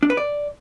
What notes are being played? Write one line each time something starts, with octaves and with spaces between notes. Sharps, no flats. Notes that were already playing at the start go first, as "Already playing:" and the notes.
D4
B4
D5